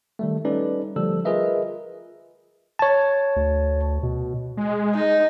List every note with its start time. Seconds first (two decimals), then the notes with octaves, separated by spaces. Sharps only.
0.19 D#3 G3 A3
0.45 G3 C#4 D#4 A4 B4 D5
0.96 D3 F3 G3 A3 A4 E6
1.25 F4 G#4 A#4 B4 D#5 E5
2.79 C#5 A5
3.36 D2
4.03 B2
4.57 G#3
4.95 D#4